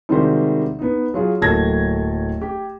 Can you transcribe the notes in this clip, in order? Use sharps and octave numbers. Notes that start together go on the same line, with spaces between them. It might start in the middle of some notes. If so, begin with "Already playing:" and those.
C3 D#3 G3 G#3 F#4 C5
B3 D#4
F#3 F4 G#4
D1 F#3 A#3 A4 G#6 A#6
G4